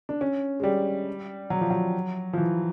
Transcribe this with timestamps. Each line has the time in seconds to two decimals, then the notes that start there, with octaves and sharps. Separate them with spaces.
0.09 D4
0.21 C#4
0.60 G#3
0.63 G3
1.50 F#3
1.61 F3
1.70 F#3
2.33 F3
2.37 E3